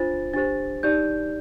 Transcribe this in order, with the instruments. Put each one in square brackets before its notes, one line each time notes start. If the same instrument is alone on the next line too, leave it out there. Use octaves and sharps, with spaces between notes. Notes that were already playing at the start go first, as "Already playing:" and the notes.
Already playing: [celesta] D4 F4 C5 A6
D4 G4 C5 A6
D#4 G4 D5 G6